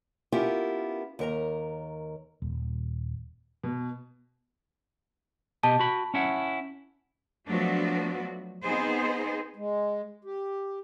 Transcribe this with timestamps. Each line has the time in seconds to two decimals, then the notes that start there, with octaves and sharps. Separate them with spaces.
0.32 B3 C#4 E4 F4 G4 A#4
1.19 D#2 A#4 A#5
2.42 D#1
3.64 B2
5.63 B2 G4 D#5 A5
5.79 F#4 B5
6.14 C#4 E4 F#5
7.47 F3 F#3 A3 B3 D4 F#4
8.62 B3 C4 D#4 G#4 C5
9.56 G#3
10.25 G4